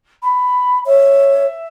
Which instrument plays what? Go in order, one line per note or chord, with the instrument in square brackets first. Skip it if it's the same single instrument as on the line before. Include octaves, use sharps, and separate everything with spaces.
[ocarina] B5
[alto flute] C#5 [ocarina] E5